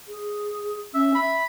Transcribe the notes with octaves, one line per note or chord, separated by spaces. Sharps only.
G#4
C#4 E5
E5 B5